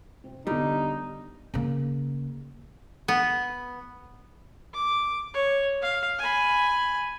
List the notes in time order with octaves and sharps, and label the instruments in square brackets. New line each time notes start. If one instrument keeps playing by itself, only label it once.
[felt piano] C3 C4
[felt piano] D3 B3 [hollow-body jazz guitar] G3 [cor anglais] D#4
[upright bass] C#3 A#3
[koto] B3
[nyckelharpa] D6
C#5
F5
G#5 B5